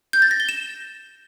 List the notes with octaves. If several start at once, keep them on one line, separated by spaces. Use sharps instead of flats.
G6
A6
A#6
G7
E7